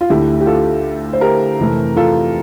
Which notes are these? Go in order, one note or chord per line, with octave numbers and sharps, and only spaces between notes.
F4
D2 D3 A3 E4 G4
G4
F4 A4
C5
G4 A#4
F2 C3 E3 A3
F4 A4